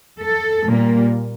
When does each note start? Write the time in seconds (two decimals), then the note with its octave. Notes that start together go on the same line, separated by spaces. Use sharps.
0.20 A4
0.67 A#2 G3 A#3